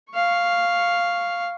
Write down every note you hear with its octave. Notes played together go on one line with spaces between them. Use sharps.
F5 C#6